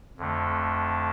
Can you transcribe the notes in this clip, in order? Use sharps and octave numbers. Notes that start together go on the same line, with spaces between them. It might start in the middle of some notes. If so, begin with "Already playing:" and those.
F2 D3 A3